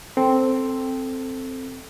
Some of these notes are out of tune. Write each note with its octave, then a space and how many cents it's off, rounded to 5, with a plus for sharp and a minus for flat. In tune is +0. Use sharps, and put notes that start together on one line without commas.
C4 +0 A4 +0